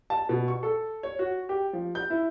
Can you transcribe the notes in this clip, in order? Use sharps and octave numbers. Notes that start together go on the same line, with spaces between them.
A5
B2
C#6
A4
C#5
F#4
G4
F3
G6
E4